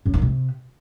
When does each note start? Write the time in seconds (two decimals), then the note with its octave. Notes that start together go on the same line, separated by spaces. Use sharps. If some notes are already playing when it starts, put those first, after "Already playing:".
0.06 F#2
0.14 D#3
0.22 C3